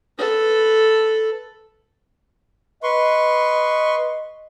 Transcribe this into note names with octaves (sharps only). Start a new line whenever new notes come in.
A4 B4
B4 D#5 C6 C#6